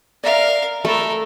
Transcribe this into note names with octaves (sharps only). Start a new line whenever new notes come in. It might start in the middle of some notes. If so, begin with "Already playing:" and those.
A#4 D5 E5 F5
A3 A4 A#4 B5